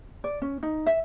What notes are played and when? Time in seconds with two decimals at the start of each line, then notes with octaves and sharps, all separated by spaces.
0.24 D5
0.42 C#4
0.63 D#4
0.86 E5